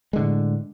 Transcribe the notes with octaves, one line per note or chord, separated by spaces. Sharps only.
A2 D3 G#3